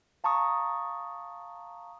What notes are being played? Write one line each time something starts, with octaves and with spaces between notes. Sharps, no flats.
F5 A5 A#5 C#6 D#6